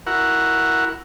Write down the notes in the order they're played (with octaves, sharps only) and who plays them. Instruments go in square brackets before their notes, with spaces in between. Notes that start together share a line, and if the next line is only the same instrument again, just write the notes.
[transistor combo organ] E4 F#4 A#4 F#5